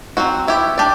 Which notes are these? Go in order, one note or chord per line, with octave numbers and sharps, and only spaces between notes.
F#3 C4 F#4
B3 E4 G4
D4 G4 D5